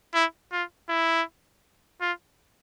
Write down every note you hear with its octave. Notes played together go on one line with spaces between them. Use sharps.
E4
F4
E4
F4